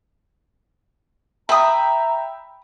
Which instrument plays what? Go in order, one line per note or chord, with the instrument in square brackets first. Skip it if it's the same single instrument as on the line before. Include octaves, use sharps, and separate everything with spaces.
[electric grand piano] E5 G5 [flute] A#5 [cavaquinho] B5 D#6